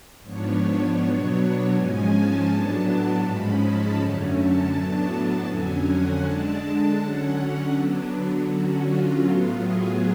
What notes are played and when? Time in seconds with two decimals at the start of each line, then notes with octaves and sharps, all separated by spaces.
0.23 G#2 F3 B3 D4 C#5
0.98 B2 F#3 B3 D4
1.72 G#2 F3 G#3 C#4 G#5
2.10 A5
2.47 A2 F#3 B3 D4 A5
3.21 G#2 F3 G#3 C#4 B5
3.60 A5
3.96 F#2 D3 F#3 A3 C#4
4.34 A5
4.71 A2 F#3 B3 D4
5.46 F2 D3 F#3 C#4 G#5
5.83 F#5
6.21 D3 G#3 D4 A5
6.95 D3 F#3 C#4 F#5
7.71 D3 F#3 B3 D4
8.45 D3 F#3 C#4 F#4
8.82 F4
9.19 A2 F#3 B3 F4
9.57 G#4